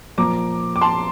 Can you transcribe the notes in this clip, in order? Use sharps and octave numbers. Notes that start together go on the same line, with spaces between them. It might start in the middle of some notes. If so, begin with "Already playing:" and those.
A#2 F3 A#3 A#5 D6
D6
A5 C6